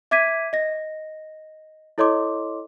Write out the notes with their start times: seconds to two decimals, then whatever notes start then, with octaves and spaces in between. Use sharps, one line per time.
0.11 E5 D6 G#6 B6 D#7
0.53 D#5 A#6
1.98 E4 A4 C#5 D#5 C6 D6